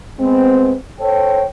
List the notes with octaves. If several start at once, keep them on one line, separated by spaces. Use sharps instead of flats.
G#3 B3 C4
A4 C5 C#5 G5